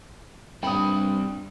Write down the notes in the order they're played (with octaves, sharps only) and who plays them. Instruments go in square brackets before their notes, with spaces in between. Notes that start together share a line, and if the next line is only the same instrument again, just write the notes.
[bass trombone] G2 [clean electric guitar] G3 C4 B5 [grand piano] G5 D#6